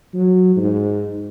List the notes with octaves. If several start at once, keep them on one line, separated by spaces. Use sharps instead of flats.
F#3
G#2